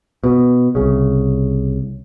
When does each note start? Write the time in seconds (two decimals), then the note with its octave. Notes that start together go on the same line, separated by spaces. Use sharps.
0.24 B2
0.75 C2 C#3